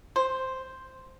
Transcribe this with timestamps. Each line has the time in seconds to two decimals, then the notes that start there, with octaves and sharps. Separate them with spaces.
0.16 C5